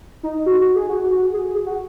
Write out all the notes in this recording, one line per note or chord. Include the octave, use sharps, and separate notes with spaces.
D#4
F#4
F#4
G#4
F#4
F#4
G#4
G#4
F#4